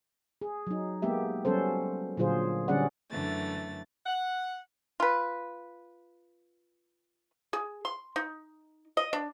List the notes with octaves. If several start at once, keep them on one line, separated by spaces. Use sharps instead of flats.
G#4
F#3 D#4
G#3 A#3 B3 G4 E5
F#3 G3 B3 C#4 A4 C5
A#2 D3 F#3 F4 G#4 C5
D3 G3 C#4 G#4 D5 F#5
F#2 D3 E3 A3 A6
F#5
F4 B4
G#4
C6
D#4
D#5
D4